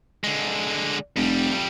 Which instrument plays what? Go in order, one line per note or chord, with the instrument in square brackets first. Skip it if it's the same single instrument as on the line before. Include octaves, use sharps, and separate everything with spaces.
[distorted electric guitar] D3 G#3
[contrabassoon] F1 [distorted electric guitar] F2 G3